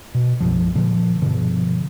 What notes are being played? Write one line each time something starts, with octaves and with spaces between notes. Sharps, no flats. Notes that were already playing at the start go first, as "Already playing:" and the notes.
B2
B1 F#2 F3
A#2 D3 F3
G2 B2 D3 F3